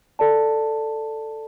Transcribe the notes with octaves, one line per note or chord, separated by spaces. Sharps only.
A4 D5 A5